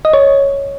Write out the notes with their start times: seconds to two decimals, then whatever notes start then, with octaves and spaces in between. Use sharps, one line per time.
0.05 D#5
0.13 C#5